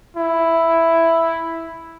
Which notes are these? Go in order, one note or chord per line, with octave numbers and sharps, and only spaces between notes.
E4